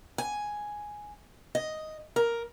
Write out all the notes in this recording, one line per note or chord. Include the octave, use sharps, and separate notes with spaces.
G#5
D#5
A#4